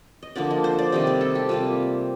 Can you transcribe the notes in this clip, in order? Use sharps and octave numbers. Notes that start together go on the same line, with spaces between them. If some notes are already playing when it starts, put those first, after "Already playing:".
D#5
D3 F3 A#3 D5
D#5
C5
D5
C3 D#3 G3 D#5
D5
A4
G4
C3 G3 A#3 F4